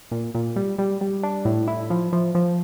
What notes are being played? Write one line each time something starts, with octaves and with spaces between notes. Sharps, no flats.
A#2
A#2
G3
G3
G3
D4
A2
E4
F3
F3
F3